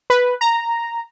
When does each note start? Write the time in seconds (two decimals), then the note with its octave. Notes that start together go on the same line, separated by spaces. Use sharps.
0.10 B4
0.41 A#5